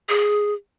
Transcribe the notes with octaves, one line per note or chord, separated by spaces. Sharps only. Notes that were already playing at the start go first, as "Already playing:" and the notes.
G#4